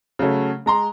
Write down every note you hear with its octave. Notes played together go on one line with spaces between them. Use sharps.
C#3 F#3 A3 C#4
G#3 A#5 C6